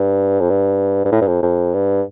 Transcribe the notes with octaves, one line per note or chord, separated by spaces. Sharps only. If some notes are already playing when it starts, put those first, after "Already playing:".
Already playing: G2
F2
G2
G2
A2
G2
F2
F2
G2